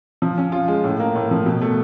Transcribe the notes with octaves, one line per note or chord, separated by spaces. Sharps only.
F3
C#4
F4
G#3
A2
A#3
A2
F3
B2
A3